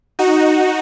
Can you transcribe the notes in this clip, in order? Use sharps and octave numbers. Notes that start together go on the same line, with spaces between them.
D#4 F#4